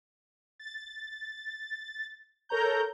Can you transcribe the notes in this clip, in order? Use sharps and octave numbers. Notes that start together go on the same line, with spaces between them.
A6
A4 A#4 C#5 A#5 G6